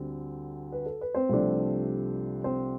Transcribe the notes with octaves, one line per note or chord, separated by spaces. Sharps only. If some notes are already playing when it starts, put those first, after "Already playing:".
Already playing: D2 D3 G3 C4
B4
A4
B4
C4 C5
C2 C3 F3 A3 D4
C4 C5